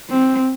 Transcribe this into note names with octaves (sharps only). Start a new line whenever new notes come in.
C4